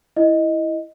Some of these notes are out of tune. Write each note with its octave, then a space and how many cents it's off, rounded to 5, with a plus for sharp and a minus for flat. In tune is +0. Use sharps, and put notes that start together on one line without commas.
E4 +0 D#5 +5